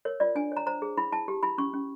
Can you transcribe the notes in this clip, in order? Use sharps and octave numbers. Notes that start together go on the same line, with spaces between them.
A#4 C#5
F4 D5
D4 G#5
C#5 A#5
C5 A#5
G#4
E4 B5
E4 A5
G4
E4 B5
C#4 C#6
C#4